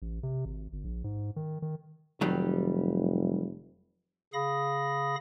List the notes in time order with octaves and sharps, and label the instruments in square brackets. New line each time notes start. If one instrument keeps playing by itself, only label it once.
[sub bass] A1
C3
G#1
G1
A#1
G#2
D#3
D#3
[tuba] F1 [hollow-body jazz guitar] D#3 F#3 G3
[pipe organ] C#3 G#4 F5 B5 D#6 A#6